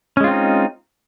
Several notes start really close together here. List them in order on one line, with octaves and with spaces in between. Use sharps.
C#4 G#3 F4 C4 D#4